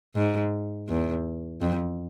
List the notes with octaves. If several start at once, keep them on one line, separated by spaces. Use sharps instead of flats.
G#2
E2
F2